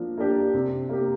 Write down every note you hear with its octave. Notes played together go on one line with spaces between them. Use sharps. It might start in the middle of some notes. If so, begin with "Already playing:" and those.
Already playing: F3 A#3 D4
A#3 D4 G4
C3
A#3 G4